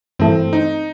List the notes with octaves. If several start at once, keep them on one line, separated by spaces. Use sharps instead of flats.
G2 E3 A3 C4 E4 A4
D#4